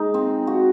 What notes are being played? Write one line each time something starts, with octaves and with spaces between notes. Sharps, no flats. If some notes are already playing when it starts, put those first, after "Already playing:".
Already playing: G#3 D#4
C4
F#4